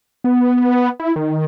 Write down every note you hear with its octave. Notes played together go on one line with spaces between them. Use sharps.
B3
E4
D#3